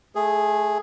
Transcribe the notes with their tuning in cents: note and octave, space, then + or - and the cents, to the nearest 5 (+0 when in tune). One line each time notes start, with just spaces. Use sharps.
A3 -20 G#4 +0